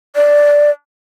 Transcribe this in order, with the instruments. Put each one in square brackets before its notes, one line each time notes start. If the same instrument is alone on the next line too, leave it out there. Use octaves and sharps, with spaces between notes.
[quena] D5